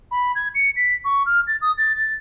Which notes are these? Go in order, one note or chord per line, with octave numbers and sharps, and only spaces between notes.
B5
G#6
C#7
B6
C#6
F6
A6
D#6
A6
A6